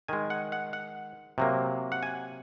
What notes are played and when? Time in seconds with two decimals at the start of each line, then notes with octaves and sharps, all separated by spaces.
0.08 D#3 G#3 G#5
0.30 F#5
0.52 F#5
0.73 F#5
1.38 C3 F#3 A#3
1.92 F#5
2.03 G#5